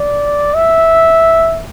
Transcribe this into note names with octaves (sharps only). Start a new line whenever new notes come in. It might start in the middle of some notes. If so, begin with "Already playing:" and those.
Already playing: D5
E5